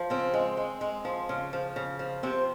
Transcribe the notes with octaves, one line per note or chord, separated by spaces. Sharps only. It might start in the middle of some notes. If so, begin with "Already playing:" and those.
Already playing: F3
C#3 C4
G#3
G#3
G#3
F3
C#3
F3
C#3
F3
C3 C4